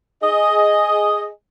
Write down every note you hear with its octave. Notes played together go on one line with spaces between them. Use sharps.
G#4 D#5